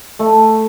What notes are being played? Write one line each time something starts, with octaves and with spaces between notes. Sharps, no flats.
A3